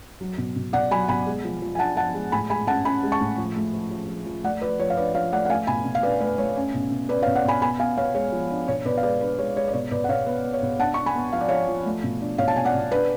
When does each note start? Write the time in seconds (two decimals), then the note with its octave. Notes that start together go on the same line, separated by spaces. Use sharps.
0.21 F#3
0.38 B2
0.56 B2
0.73 B2 D5 F#5
0.91 F#3 G#5 B5
1.08 B2 G#5 B5
1.27 G#3
1.44 F3
1.62 F3
1.75 G#5
1.79 D4 F#5 A5
1.97 F3 F#5 A5
2.14 G#3
2.32 A2 G#5 B5
2.50 G#3 G#5 B5
2.67 C#4 F#5 A5
2.85 C#4 G#5 B5
3.03 G#3
3.12 A5 C#6
3.21 A2
3.38 F3
3.56 A3
3.73 F3
3.91 F3
4.09 F3
4.26 F3
4.44 A3 D5 F#5
4.61 F3 B4 D5
4.80 F3 C#5
4.90 F5
4.97 D4 B4 D5
5.14 F3 C#5 F5
5.32 A3 D5 F#5
5.45 F#5
5.50 A3 F5 G#5
5.67 B2 G#5 B5
5.85 B2
5.95 F5
6.03 D4 B4 D5
6.21 A3 B4
6.38 A3 C#5
6.56 C#4
6.74 B2
6.91 B2
7.09 C#4 B4 D5
7.22 C#5 F5
7.27 B2
7.35 D5 F#5
7.44 B2 G#5 B5
7.62 B3 G#5 B5
7.80 B3 F5 G#5
7.97 B3 C#5 F5
8.15 G#3 C#5
8.32 F3
8.50 D4
8.68 B2 C#5
8.85 B2 B4 D5
8.97 F5
9.03 G#3 B4 D5
9.21 D4 B4
9.38 G#3 C#5
9.56 G#3 C#5
9.68 D5
9.74 B2 C#5
9.91 B2 B4 D5
10.04 F#5
10.09 B2 C#5 F5
10.26 B3 B4
10.44 B3
10.53 C#5
10.62 B2
10.79 D4 F#5 A5
10.94 D4 C#6
11.06 G#5 B5
11.15 B3
11.33 F3 F5
11.41 D5
11.48 F3 C#5 F5
11.68 F3
11.86 A3
12.04 B2
12.21 D4
12.38 B2 C#5 F5
12.48 A5
12.56 B2 G#5
12.65 D5 F#5
12.74 B2
12.92 D4 B4 D5